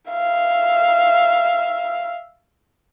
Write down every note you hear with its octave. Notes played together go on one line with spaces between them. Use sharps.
E5 F5